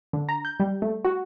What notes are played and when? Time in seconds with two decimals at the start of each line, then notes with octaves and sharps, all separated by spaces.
0.13 D3
0.29 A#5
0.45 G6
0.60 G3
0.82 A3
1.05 F#4